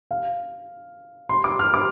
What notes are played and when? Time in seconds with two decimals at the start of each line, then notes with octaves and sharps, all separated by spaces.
0.11 F5
1.29 C6
1.44 D6
1.59 F6
1.74 D6